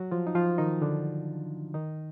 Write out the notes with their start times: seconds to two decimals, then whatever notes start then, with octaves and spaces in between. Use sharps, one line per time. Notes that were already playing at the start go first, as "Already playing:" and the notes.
Already playing: F#3 F#4
0.11 F3 F4
0.27 D#4
0.35 F3 F4
0.58 D#3 D#4
0.82 D3 D4
1.74 D#3 D#4